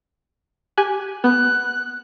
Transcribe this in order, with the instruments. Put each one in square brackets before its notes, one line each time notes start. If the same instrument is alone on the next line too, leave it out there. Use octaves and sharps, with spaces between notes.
[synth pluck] G4 G#5 F#6
[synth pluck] B3 [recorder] F#6